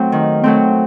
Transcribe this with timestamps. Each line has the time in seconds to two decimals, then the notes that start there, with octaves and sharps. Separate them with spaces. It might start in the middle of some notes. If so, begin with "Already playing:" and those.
Already playing: F#3 A3 C4
0.12 D#3
0.44 F#3 A3 C4